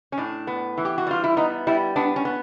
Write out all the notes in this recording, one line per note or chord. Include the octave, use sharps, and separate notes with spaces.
C#4
A2 D4
B3
E3
G4
F#4
G3 F4
E4
B3 D#4
G3 E4
B3 D4
C#4
B3